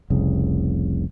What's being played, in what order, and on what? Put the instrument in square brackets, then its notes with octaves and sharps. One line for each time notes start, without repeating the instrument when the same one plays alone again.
[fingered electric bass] F1 C2 C#3